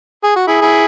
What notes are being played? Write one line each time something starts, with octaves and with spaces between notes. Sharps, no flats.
G#4
F#4
E4 G#4
E4 G#4